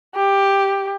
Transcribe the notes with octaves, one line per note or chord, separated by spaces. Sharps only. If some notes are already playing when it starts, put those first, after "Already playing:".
G4